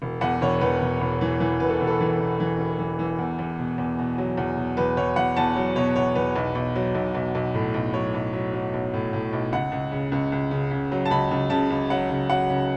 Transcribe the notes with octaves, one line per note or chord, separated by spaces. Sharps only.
E1
E2 F#5
E1 C#5
E2 B4
E1
E1
E3
E3
E1 B4
A4
E1
A4
E3
E1
E3
E1
E3
E3
E2
E2
B2
E2
B2
F#3
E2
B2
E2 B4
E2 C#5
E2 F#5
E2 A5
F#3
B2 C#5
E2 C#5
E2 B4
B1
B1
F#3
B1
B1
B1
A2
B1
F#3 C#5
B1
F#3
F#3
B1
A2
A2
B1
C#2 F#5
C#2
C#3
C#2
C#2
C#3
C#3
F#3
A5
C#2 B5
C#2
C#3 A5
C#2
F#3 F#5
C#3
F#3 F#5
C#3